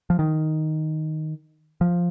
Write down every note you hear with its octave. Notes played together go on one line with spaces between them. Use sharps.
F3
D#3
F3